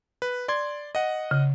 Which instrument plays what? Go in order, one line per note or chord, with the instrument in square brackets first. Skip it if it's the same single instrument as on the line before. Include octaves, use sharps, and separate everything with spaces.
[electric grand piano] B4
D5 C6 G#6
D#5 F#5
[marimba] C#3